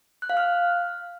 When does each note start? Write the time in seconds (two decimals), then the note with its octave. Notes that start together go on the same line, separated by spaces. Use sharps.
0.22 F#6
0.30 F5
0.37 F6